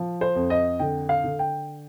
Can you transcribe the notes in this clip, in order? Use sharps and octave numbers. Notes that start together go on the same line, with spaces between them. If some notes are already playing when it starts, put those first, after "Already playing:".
Already playing: F3
C5
F2
D#5
D3 G5
F5
D3
G5